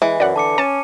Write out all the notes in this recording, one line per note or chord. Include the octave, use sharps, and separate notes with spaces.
E3 G#3
F#2 D5 F#5
D3 A5 D6 C#7
C#4 A5 D#7